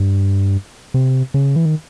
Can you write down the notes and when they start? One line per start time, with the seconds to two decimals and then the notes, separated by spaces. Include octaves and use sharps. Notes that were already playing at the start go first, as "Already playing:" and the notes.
Already playing: G2
0.94 C3
1.34 C#3
1.56 E3
1.66 D#3